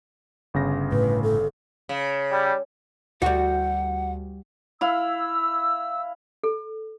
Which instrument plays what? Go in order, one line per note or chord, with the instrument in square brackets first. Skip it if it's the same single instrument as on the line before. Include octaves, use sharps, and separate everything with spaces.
[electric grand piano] G1 C#3 A#6
[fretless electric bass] A2 [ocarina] B4
[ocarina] A4
[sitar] C#3
[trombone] G3
[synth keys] D2 [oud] G3 F#4 [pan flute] F#5
[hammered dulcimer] E4 F5 [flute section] E6
[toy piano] A4